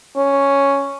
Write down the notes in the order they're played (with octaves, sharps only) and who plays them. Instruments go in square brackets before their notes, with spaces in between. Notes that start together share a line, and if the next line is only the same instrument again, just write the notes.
[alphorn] C#4